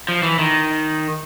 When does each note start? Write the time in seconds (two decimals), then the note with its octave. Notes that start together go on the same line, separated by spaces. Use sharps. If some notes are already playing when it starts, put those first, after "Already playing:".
0.08 F3
0.23 E3
0.39 D#3